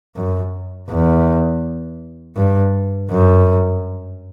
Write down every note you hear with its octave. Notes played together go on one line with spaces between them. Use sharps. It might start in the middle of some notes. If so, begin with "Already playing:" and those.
F#2
E2
G2
F#2